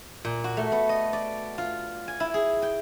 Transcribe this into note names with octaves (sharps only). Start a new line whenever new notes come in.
A#2
F#4
A3
B3
D#5
D5
F4
G#5
E4
G#4
G5